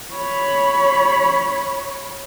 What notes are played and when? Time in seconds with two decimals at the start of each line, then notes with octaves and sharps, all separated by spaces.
0.13 C#5 B5